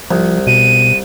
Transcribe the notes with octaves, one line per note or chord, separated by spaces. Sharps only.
C2 F3
B2 D#7